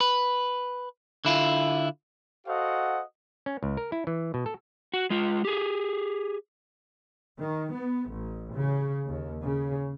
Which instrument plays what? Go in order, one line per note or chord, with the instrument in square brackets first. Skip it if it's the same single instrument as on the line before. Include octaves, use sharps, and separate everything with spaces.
[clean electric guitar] B4
D3 E4 F4
[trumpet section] F#4 A4 C5 D#5 F5 F#5
[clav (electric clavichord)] C#4
C#2
A#4
E4
E3
B2
A4
[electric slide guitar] F#4
G#3 F4
G4 G#4
[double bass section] D#3
B3
A1
C#3
D#2
C#3